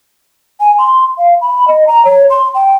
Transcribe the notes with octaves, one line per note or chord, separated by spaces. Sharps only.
G#5
C6
F5
B5
D#5
A#5
C#5
C6
G5